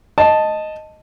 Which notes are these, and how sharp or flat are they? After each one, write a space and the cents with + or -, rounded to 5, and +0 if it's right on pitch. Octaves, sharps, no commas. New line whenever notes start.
D#5 +0 A5 +0